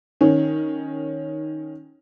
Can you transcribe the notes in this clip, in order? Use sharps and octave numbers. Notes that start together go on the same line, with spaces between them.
D#3 C#4